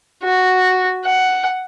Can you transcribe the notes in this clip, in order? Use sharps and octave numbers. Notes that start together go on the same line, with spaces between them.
F#4
F#5